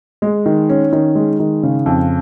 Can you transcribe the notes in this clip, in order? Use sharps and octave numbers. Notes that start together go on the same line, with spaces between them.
G#3
D#3
C#4
D#3
G#3
D#3
C#3
F2